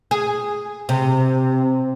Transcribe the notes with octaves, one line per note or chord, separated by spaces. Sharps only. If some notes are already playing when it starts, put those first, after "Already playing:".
G#4
C3